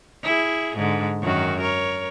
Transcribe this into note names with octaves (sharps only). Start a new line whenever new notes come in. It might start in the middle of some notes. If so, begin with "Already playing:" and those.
E4 G#4
G#2 D3
F#2 D#3 F#4
A#4 C#5